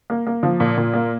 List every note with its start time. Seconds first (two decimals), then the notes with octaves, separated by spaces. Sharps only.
0.10 A#3
0.27 A#3
0.43 F3
0.60 A#2
0.77 A#2
0.94 A#3